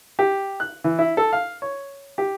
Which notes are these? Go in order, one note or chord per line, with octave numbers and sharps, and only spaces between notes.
G4
F#6
E3
E4
A4
F5
C#5
G4